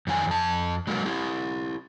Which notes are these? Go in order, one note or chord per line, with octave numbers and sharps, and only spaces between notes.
F2 D#3 F#4 G#5
F2 A5
F#3 G#3 A#3 A4 A#4
E4 G4